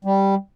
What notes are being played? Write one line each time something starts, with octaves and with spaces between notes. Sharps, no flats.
G3